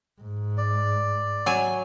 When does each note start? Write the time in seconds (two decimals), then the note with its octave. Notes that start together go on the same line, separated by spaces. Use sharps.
0.21 G#2
0.58 D5
1.46 F#3 G#5